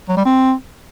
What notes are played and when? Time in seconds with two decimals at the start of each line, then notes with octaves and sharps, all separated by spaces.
0.09 F#3
0.17 G3
0.25 C4